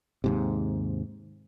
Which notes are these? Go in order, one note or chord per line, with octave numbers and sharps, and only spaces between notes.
D#2 G#2 C3